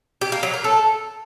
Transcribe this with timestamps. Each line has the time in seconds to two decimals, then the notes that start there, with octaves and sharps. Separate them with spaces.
0.21 G4
0.32 A#3
0.43 F#3
0.54 A#4
0.64 A4